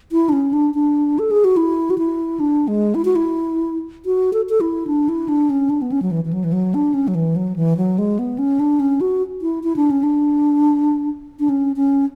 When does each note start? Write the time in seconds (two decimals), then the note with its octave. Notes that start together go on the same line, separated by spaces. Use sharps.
0.12 E4
0.29 D4
0.33 C#4
0.53 D4
0.74 D4
1.19 A4
1.31 G#4
1.44 F#4
1.57 E4
1.90 F#4
1.98 E4
2.40 D4
2.68 G#3
2.95 E4
3.05 F#4
3.16 E4
4.06 F#4
4.33 A4
4.49 A4
4.61 E4
4.87 D4
5.09 E4
5.28 D4
5.50 C#4
5.70 D4
5.82 B3
5.92 C#4
6.02 F#3
6.11 E3
6.25 E3
6.33 F#3
6.44 E3
6.53 F#3
6.74 D4
6.94 C#4
7.08 F#3
7.15 E3
7.36 F#3
7.56 E3
7.77 F#3
7.98 G#3
8.19 B3
8.38 C#4
8.60 D4
8.80 C#4
9.01 F#4
9.42 E4
9.63 E4
9.76 D4
9.91 C#4
10.03 D4
11.40 D4
11.49 C#4
11.76 C#4